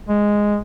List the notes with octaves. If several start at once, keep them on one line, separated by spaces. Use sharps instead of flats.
G#3